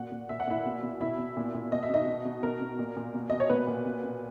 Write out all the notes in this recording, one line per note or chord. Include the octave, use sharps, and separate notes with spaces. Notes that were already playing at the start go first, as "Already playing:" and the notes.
Already playing: A#2 F#4 F#5
A#2
A#2 E5
F#5
A#2 E4 E5
B2
B2
B2 E4 E5
B2
A#2
A#2
B2 D#5
E5
B2 D#4 D#5
B2
B2
B2 A#4
B2
A#2
A#2
B2
B2 D#5
C#5
A#2 B3 B4
A#2
B2
B2